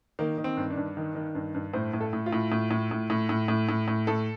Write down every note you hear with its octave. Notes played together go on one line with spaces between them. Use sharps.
D#3 A#3
D#3
C4
G2
D4
G2
D#3
D#3
G2
G2
A2 C5
A2
A4
A2
F4
A2
A2
A2
A2
A2
A2
A2
A2
A2
A2 A4